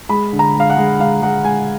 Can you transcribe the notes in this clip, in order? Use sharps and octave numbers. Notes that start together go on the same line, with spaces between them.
G#3 B5
D3
A#5
G#3 F5
F#5
G#3
G#3 F5
G#3 F#5
G#3 G#5